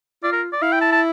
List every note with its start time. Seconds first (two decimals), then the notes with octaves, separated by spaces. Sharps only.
0.23 F4 D5
0.33 A#4
0.53 D5
0.62 E4 F5
0.72 G5
0.82 A5
0.92 A5